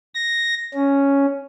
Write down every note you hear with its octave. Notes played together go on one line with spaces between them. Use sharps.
A#6
C#4